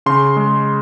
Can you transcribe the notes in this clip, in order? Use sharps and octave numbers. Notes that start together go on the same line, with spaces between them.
C#3 C6
G#3